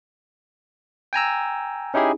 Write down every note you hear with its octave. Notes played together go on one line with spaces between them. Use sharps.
G5 G#5 A#5 E6
C#4 D#4 E4 G4 G#4